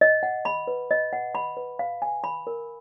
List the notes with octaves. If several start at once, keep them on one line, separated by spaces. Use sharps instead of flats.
D#5
F#5
B5
B4
D#5
F#5
B5
B4
F5
G#5
B5
A#4